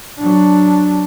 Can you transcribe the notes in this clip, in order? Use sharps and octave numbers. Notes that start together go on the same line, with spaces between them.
F#3 D4